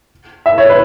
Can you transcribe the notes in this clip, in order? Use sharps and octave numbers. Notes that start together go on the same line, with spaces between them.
E5
C#5
B4